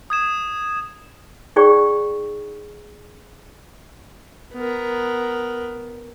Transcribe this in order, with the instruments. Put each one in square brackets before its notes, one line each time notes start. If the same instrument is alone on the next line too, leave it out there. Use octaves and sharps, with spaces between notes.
[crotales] D#6 G#6 E7
[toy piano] D#4 G#4 C#5 D5 G5 C#6
[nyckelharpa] B3 A#4